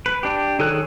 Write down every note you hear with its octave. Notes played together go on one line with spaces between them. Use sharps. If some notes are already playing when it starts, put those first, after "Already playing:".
B4
D4 G4
D#3 G#4 A4 C#5 F#6